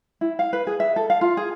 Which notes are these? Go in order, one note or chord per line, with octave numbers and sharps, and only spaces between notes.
E4
F5
B4
G#4
E5
A4
F5
F4
G#4